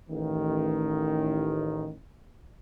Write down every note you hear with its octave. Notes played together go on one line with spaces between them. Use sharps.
A1 D#3